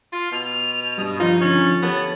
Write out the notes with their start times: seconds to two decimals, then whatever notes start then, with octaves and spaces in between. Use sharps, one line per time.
0.12 F4 F5
0.32 B2 F7
0.98 G2 D#6
1.20 F3 D#4 F4
1.41 D3 C#4 A6
1.82 B3 G4 A4 C#5